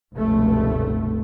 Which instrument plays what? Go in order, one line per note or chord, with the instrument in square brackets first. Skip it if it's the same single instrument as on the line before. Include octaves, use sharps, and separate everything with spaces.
[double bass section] F1 C#2 G2 B2 A3